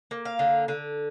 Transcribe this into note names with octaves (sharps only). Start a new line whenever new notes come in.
A#3
F5
D3
D3